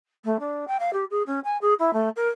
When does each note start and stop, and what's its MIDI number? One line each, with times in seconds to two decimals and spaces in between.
0.24 0.37 57
0.39 0.65 62
0.67 0.76 79
0.79 0.93 77
0.93 1.04 67
1.10 1.22 68
1.26 1.39 61
1.44 1.57 80
1.61 1.73 68
1.79 1.93 64
1.93 2.09 57
2.16 2.28 70